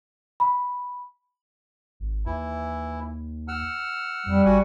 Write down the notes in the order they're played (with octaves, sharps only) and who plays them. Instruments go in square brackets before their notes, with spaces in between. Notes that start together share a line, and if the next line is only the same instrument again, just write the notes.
[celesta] B5
[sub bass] G#1
[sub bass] D#2 [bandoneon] E3 E4
[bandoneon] F#5 E6 F6
[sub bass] F2 [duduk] G3
[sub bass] G#1 [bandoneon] F#4 F#5 G#5